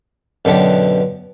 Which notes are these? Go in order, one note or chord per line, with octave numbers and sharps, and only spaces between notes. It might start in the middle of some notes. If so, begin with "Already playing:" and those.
F#2 B2 D3 B3 G4